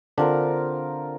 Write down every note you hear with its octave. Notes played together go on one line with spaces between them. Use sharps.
D3 C4 D4 F4 A#4